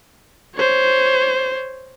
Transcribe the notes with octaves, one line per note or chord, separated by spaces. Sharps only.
C5 C#5